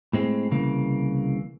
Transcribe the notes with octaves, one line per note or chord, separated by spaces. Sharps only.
A2 G#3 C4
C2 C#3 E3 A#3